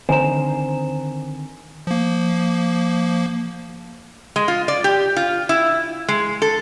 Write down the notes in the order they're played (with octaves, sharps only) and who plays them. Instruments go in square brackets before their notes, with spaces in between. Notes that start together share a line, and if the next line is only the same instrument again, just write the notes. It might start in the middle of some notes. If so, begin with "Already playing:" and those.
[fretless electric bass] D3 D#3 C4 [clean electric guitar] C5 A#5 [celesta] G#5 E7
[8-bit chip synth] F3 A#3
[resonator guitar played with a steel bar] G#3
F4
D5
G4
F4
E4
G#3
A4